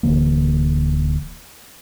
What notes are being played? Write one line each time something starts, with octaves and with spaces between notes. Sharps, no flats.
D1 D3 E3 A#3